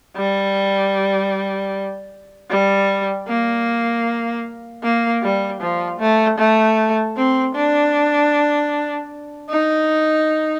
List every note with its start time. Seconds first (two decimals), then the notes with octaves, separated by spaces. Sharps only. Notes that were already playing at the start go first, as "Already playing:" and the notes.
0.16 G3
2.50 G3
3.28 A#3
4.83 A#3
5.22 G3
5.61 F3
6.00 A3
6.38 A3
7.16 C4
7.55 D4
9.50 D#4